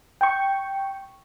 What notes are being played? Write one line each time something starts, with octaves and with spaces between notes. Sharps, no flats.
G5 C#6